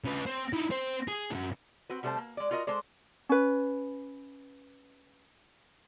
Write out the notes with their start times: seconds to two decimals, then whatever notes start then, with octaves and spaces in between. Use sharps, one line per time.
0.05 C#3 B4
0.26 C4
0.53 D#4 E4
0.70 C4 C5
1.08 G#4
1.31 C2 F#2
1.90 C4 F#4 B4
2.03 C3 G3 A3 D4 C5 A5
2.18 A#3
2.37 G#3 D5
2.51 F4 F#4 A#4 D#5
2.67 G#3 A4 C5 D5
3.29 C#4 B4